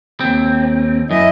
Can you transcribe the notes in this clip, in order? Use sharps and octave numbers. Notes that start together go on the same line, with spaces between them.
D#2 C4
F#2 E4 D#5